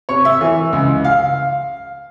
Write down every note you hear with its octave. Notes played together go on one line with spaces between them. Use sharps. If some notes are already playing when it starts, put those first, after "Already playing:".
C3 C#5
E5
E3
C#2
F5